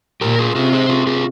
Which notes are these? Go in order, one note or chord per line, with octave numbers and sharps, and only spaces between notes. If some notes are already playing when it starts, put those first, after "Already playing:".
A#2 G4 A#4
F4 G#4
C3 F4 G#4
G#4 C5
F4 G#4
F4 G#4